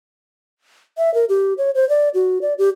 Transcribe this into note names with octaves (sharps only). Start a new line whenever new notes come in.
E5
A#4
G4
C#5
C5
D5
F#4
D5
G4